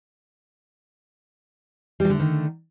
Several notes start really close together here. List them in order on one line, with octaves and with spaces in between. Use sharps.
G3 F#3 D3 A3 D#3